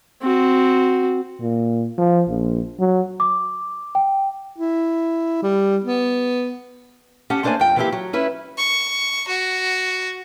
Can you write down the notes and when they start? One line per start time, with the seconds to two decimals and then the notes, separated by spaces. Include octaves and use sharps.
0.22 C4 F#4
1.41 A#2
1.98 F3
2.29 A#1
2.80 F#3
3.20 D6
3.95 G5
4.58 E4
5.43 G3
5.84 B3
7.30 C#4 G4 F#5 A5
7.43 A3 A#3 D4 C5 C#5 G#5
7.60 F2 G5
7.76 E3 F3 A#3 C4 E4 G4
7.92 F#3
8.13 C#4 E4 B4
8.57 C#6
9.28 F#4